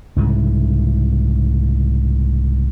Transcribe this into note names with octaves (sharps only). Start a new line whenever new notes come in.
C2 G#2 C#3 E3